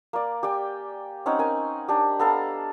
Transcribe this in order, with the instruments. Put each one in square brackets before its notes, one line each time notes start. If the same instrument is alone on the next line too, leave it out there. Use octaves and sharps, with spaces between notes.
[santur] A#3 D5
G4 D5 G5 G#5
C4 C#4 D#4 F#5
A#4 G#5
D4 G4
B3 A4 F5 A#5